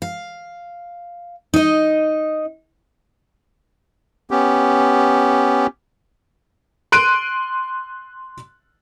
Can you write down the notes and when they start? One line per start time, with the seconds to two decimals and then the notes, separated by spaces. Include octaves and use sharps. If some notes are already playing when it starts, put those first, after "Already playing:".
0.02 F5
1.54 D#4 D#5
4.31 B3 C#4 G4
6.92 C6 F#6 D7 D#7